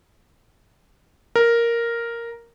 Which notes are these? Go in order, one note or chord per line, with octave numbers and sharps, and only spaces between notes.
A#4